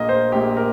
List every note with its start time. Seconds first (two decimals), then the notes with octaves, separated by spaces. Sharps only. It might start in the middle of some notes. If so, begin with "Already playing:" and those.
Already playing: A#1 A#2 A#3 D#5
0.09 C5
0.32 A#1 A#2 A#3 G4
0.57 A#4